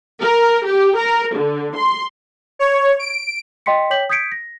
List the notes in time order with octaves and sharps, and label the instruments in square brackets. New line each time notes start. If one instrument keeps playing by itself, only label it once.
[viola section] A#4
G4
A#4
D3
C6
[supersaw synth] C#5
D7
[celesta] D#5 G5 C6 B6 C#7
C#5 G5 D6 G6 B6 F#7
D#6 G6 G#6 B6 C#7 D7
A#6